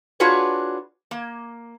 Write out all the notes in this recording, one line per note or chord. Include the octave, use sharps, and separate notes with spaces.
D4 F4 F#4 G#4 B4 C#5
A#3